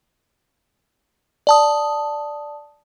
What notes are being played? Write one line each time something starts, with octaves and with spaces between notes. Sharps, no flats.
D5 A5 D#6